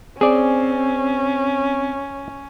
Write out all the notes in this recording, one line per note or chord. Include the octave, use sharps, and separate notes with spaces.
C4 C#4 G#4 D5